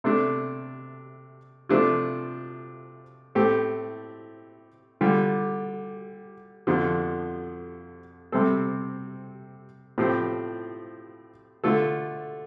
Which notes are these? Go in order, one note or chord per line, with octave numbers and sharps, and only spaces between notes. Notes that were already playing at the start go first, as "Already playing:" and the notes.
C3 A3 D4
C3 F3 A3 D4 F4
A2 A3 C4 G4
D3 G3 F4
F2 D3 F3
C3 G3 C4 A4
A2 F3 C4 G4
D3 A3 F4 A4